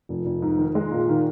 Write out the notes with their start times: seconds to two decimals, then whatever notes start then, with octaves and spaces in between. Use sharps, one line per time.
0.09 F1
0.25 F1
0.42 G#2
0.59 D#3
0.75 G#3
0.91 A#2
1.09 D#3